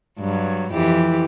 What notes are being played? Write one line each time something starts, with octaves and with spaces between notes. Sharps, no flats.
G2 F#3
F2 E3 G4